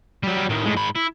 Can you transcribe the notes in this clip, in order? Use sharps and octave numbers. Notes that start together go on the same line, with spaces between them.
F#3 G3
A2 D#3
A2 G#3
G#2 B5
E4